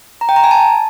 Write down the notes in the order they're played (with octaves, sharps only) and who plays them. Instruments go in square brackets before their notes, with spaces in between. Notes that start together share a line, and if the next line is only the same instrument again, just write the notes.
[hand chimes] A#5
G5
A#5
G#5
A5